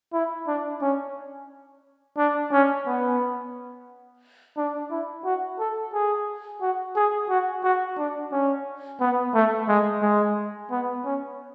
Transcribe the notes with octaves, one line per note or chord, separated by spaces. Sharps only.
E4
D4
C#4
D4
C#4
B3
D4
E4
F#4
A4
G#4
F#4
G#4
F#4
F#4
D4
C#4
B3
A3
G#3
G#3
B3
C#4